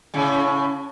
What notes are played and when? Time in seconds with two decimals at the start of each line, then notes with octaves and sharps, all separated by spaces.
0.14 A2 C#3